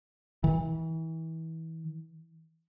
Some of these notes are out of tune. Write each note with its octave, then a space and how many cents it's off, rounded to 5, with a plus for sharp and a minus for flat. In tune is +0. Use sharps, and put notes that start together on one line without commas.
E3 -30